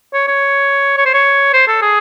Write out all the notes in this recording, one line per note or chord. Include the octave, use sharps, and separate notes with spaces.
C#5
C#5
C#5
C5
C#5
C5
A4
G#4